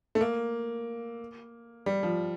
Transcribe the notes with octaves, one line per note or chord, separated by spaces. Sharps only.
A3
A#3
G3
F3